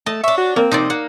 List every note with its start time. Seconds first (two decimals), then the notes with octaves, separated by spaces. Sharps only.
0.06 A3 D#5 A5
0.24 D4 C#5 E5
0.38 F#4
0.56 A#3 C4
0.72 C3 F3 D#4 D5 D#5
0.90 A#3 F#5